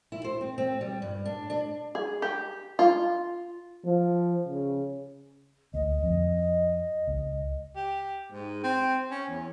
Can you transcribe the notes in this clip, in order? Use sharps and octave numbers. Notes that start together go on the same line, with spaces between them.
E4
C5
C4
C4
G3
G2
D4
D4
G#4
G4
F4
F3
C#3
D2 D#5
F2
C#2
G4
G#2
C4
C#4
E2